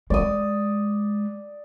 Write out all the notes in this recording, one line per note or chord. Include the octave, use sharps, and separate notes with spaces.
G#3 D5 D#6